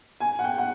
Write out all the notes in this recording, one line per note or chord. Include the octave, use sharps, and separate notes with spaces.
G#5
F#5
G5
F#5